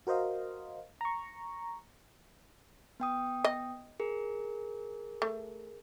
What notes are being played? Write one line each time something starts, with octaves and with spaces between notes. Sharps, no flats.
F#4 A#4 C5 D#5 F5
A#5 C#6
B3 G5 D#6
D#5
G#4 A#4
A3